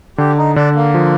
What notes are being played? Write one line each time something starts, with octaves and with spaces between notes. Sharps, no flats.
D3 G4
D#4
D3 D4
A#3
F3